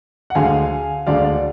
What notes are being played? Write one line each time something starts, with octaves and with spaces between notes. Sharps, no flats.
F#5
D2 D3 G#3 F5 G#5
D2 D3 G#3 D5 F5
D5